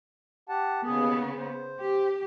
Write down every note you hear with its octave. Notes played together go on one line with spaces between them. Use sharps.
G4 F#5 A5
D#2 C#3 B3 G#4
C5
G4